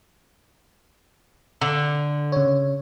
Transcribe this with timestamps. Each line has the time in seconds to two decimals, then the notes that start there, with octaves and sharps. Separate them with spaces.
1.61 D3
2.32 C#3 C#5